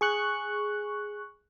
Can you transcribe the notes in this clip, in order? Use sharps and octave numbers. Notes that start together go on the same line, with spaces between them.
G#4 C#6 F#6